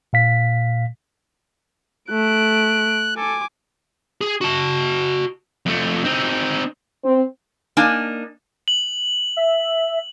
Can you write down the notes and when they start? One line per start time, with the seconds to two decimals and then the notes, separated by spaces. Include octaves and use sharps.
0.13 A#2 F5 B6
2.10 A3 F#6 D7
3.17 A4 G#5 D6
4.21 G#4
4.41 F#4 A5
5.66 F2 A3
6.05 C4 D#4
7.03 C4
7.77 A#3 D4 D#4 G#5
8.68 F#7
9.37 E5